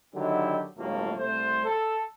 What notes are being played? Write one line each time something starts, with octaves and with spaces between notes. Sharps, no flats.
D3 D#3 F#3 D#4 E4 G4
G1 C#2 A2 F#3 A3 A#3
C2 A3 C5
A4